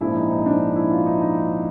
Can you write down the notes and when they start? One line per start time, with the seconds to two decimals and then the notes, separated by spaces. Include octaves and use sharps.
0.01 A#1 G#2 F3 E4
0.17 D#4
0.31 D#4
0.46 D4
0.62 D#4
0.76 E4
0.91 F4
1.06 D#4
1.21 D#4